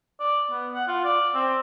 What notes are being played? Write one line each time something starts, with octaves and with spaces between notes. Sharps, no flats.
D5
B3
F#5
F4
D5
C4